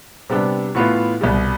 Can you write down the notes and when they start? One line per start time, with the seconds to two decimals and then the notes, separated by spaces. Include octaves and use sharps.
0.29 C3 G3 B3 D4 G4
0.75 A2 E3 B3 F4
1.21 C2 B2 G3